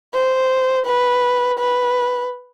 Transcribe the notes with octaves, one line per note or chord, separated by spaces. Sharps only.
C5
B4
B4